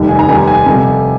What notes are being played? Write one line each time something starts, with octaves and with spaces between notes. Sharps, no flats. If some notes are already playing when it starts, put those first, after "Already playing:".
Already playing: F1 D#2 D#3 G3
G#5
A#5
F1 D#2 D#3 G3 G#5
G#5
F2 C3 G3